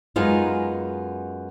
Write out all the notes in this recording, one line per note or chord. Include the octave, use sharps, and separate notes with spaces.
F#2 G#3 B3 D#4 F4